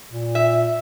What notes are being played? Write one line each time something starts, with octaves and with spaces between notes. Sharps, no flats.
A#2
E5